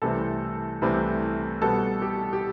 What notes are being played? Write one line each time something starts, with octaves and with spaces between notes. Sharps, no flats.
C2 C3 E3 A3 C4 A4
C2 C3 E3 A3 C4
B2 G3 B3 A4
G4
G4